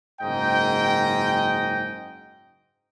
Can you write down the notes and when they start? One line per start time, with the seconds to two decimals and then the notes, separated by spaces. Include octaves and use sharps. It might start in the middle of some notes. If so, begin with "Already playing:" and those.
0.21 F#1 G#2 D#5 G5